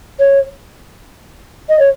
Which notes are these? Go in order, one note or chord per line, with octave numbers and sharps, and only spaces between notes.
C#5
D#5
C#5